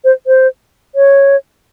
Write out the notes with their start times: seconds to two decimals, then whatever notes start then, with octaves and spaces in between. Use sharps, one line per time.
0.04 C5
0.27 C5
0.95 C#5